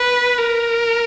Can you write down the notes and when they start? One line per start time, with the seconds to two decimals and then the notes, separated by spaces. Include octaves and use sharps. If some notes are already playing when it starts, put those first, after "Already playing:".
Already playing: B4
0.38 A#4